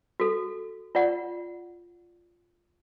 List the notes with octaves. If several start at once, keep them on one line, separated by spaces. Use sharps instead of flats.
F#4 A4
F4 D5 F#5